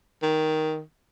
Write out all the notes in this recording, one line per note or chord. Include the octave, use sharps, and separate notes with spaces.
D#3